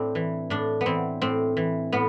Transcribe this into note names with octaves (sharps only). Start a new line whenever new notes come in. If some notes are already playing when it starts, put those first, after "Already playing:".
Already playing: A2 C4 D4
E3
A2 D4
B3
E3 C4
A2 C4
E3
A2 B3